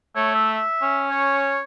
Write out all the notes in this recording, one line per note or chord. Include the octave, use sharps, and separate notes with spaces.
A3 C#5
E5
C#4
C#5